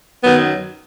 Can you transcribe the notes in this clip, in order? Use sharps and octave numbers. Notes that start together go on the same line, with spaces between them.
F#2 D#3 F#3 B3